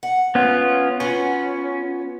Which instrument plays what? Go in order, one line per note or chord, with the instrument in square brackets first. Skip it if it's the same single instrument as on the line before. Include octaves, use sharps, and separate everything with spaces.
[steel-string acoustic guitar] F#5
[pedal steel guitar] B3 C#4 F4
[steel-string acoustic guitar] B3 F4 F#4 [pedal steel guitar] C#4